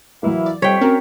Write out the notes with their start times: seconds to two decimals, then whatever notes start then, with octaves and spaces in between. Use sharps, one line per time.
0.23 E3 F#3 A#3 E4 F5
0.46 D5
0.62 F2 G3 C#5 G5 B6
0.81 C4 C#4 F#4 A#4